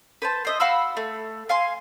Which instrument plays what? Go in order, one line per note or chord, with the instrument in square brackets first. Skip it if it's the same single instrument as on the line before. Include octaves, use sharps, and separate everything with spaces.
[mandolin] B4 C5 A5
C5 D#5 E5
F#4 F5 B5 E6
A3
F5 G#5 C6